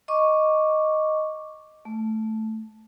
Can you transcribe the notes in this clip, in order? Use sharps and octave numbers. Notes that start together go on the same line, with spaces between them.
D#5 C#6 D6
A3